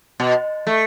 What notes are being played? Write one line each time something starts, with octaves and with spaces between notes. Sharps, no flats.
B2
A3